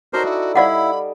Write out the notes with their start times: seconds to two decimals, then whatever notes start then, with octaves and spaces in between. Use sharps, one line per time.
0.13 D#4 F#4 A4 A#4 C5 D5
0.25 E4
0.55 G3 E4 D5 F5 F#5 B5